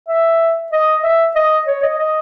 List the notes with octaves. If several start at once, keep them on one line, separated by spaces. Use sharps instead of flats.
E5
D#5
E5
D#5
C#5
D#5
D#5